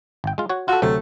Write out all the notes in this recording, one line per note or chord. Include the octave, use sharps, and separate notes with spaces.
G#1 G5
G#3 F4
F#4 C#5
F4 F#4 A4
D2 C3 F#3 A3